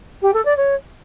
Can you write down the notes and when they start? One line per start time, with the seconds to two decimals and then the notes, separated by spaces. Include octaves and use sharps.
0.22 G4
0.33 A4
0.45 D5
0.57 C#5